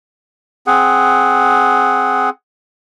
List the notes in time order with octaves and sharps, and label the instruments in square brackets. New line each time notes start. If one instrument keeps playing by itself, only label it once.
[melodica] C4 G#4 F#5